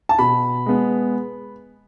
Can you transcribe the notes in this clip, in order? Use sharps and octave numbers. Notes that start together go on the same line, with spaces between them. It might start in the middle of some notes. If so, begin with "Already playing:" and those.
A5
B2 B5
G#3 B3